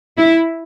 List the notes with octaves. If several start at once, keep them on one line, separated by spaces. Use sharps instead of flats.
E4